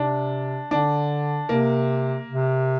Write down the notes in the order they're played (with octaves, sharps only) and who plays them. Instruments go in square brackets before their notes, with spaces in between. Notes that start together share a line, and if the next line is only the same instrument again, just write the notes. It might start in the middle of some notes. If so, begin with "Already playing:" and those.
Already playing: [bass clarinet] C3 [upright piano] D4
[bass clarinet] D3 [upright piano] D4
[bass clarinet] C3 [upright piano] A#3
[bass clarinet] C3